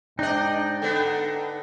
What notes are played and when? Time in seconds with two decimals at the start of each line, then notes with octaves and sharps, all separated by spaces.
0.19 G#2 D4 D#4 D5 D#5 G5
0.82 D3 B3 A4 G5